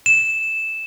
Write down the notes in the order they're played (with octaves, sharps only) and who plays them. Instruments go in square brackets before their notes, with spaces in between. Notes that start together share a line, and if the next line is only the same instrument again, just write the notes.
[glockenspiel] E7